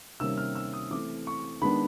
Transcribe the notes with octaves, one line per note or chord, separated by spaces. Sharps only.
C3 D#3 G3 A#3 C#4 E6
F6
E6
D#6
E3 A3 C4 D6
C#6
D#3 G#3 B3 D4 B5